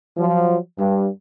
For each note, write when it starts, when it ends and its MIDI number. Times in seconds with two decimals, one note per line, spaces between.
0.17 0.56 53
0.17 0.56 54
0.79 1.08 43